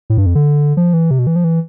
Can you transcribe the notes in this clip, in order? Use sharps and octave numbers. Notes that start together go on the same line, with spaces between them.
A2
G2
F2
D3
F3
E3
C3
B2
E3
F3
E3